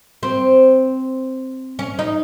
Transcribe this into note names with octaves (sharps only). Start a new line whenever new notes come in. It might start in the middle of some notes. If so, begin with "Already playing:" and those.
C4
C#4
D#4